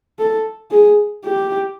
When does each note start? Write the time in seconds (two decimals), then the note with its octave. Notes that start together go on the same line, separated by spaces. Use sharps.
0.19 A4
0.71 G#4
1.25 G4